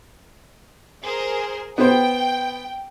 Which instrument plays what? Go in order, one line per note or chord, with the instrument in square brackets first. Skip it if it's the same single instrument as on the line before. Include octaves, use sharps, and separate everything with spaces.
[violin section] G#4 A#4 C5
[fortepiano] B3 C5 [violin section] G5